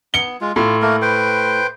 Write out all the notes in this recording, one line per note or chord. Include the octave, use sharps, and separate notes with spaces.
B3 C#7 G7
G#3 F4
A2 F4
A3 A#3 A#4
B4 C5 G5